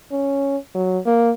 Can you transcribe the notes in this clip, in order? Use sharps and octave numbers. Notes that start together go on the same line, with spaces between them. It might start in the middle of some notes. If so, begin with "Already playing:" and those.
C#4
F#3
A#3